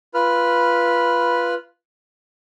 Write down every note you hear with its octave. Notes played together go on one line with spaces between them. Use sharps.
F4 B4 B5 F6